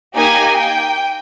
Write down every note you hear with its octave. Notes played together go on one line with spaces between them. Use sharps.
A#3 D#4 G4 G#5
G5